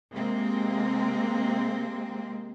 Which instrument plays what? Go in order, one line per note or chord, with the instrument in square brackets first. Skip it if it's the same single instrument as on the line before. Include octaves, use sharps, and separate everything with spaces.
[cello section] C3 G#3 A#3 C4